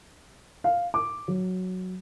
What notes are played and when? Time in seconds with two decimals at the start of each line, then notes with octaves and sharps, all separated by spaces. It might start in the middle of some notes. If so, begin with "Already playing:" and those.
0.64 F5
0.94 D6
1.28 F#3